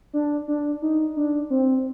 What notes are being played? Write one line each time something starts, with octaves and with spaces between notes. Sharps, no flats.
D4
D4
D#4
D4
C4